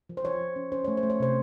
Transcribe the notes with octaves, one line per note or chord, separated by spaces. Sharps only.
F3
C5
F3 C#5
F3
C#4
C#4 C5
A3 C#5
C5
A3
C#5
C3 C5